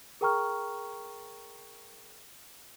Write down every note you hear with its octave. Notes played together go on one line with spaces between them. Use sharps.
G#4 A#4 G5 A#5 C#6 F6